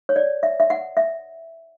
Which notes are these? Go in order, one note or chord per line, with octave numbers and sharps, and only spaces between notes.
C#5
D5
E5
E5
F#5
E5